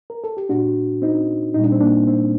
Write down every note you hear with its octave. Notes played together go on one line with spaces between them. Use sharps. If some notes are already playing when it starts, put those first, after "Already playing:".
A#4
A4
G4
A#2 A3 D4 F#4
C4 D#4
A#2 G3 D#4
D4
C4
A#3 D4
C4